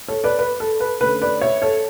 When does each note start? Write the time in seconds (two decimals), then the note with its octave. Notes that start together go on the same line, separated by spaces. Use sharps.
0.08 A4 C#5
0.24 B4 D5
0.39 B4
0.60 A4
0.80 B4
1.01 D3 A3 C#4 B4
1.22 B4 D5
1.41 C#5 E5
1.62 A4 C#5